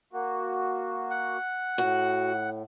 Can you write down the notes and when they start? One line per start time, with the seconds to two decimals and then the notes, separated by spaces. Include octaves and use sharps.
0.13 A#3 F#4
1.11 F#5
1.78 A2 F#4